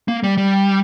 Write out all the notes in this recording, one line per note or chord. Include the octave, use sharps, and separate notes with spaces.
A#3
G3
G3